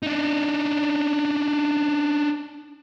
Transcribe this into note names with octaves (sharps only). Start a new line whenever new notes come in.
D4 D#4